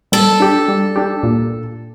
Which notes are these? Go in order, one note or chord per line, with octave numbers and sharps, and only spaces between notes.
G3 A4
D4 G4
G3
D4 G4
A#2